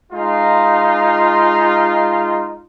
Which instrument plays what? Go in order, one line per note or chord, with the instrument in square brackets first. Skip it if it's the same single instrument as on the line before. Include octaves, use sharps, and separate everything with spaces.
[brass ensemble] G#3 D#4 F4